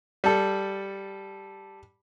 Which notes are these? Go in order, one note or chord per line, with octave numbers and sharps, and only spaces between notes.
G3 A4